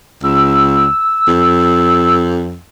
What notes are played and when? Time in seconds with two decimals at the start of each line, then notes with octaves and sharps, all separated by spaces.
0.23 C#2 E6
1.28 F2